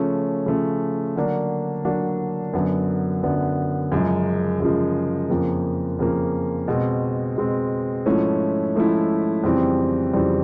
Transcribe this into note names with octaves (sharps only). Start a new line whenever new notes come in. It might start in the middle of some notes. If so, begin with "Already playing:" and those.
Already playing: C#3 F3 A3 C#4
C#3 F3 A3 C#4
D3 F#3 A#3 D4 F#4
D3 F#3 A#3 D4 F#4
F#2 D3 F#3 B3
F#2 D3 F#3 B3
F#2 C#3 F3 G#3
F#2 C#3 F3 G#3
F2 C#3 F3 A#3
F2 C#3 F3 A#3
B2 G#3 C4
B2 G#3 C4
G#2 F3 A3 C#4 E4
G#2 F3 A3 C#4 E4
F2 C#3 E3 G3 C4
F2 C#3 E3 G3 C4